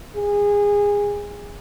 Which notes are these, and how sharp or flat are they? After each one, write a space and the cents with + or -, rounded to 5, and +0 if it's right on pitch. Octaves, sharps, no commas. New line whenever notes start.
G#4 -20